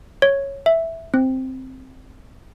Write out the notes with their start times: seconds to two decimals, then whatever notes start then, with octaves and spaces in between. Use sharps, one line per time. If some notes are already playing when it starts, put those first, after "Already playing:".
0.22 C#5
0.66 E5
1.14 C4